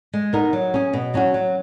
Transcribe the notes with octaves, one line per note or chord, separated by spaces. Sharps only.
G#3
B3 D#4 A#4
F#3
C#4 G#4
B2
F#3 C#4 F#4
F#3